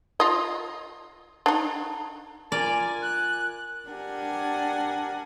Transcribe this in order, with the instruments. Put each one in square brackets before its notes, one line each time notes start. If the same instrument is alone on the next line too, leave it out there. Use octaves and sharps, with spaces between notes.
[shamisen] F4 D#5
D4 D#4
[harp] F4 A#4 [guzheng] D5 [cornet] G#5
[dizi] F#6
[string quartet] D4 G4 A#4 F#5 G#5